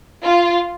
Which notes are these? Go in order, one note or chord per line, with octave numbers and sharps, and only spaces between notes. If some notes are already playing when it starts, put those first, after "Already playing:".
F4